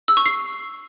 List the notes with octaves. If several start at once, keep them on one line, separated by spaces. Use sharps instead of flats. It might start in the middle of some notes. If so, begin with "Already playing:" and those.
E6
C#6
C7